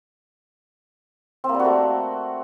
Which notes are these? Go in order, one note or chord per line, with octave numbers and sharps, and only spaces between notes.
C4
A#3
G3
F#4
A3